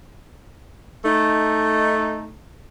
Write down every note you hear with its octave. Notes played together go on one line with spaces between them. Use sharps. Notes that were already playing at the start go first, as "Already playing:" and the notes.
A3 D#4